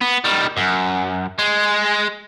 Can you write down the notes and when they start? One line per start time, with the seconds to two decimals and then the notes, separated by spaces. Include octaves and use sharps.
0.01 B3
0.24 D#3 G3
0.57 F#2
1.39 G#3